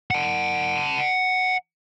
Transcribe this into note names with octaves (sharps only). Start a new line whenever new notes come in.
F#5 A5